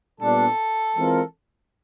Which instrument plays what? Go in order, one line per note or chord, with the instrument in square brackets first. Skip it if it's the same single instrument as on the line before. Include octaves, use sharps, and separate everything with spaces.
[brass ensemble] A#2 G3 B3 D4 [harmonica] A4
[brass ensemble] E3 G#3 C4 F4 A#4